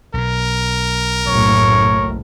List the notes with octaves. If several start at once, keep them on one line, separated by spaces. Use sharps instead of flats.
B1 B2 A#4
F#1 A2 C#5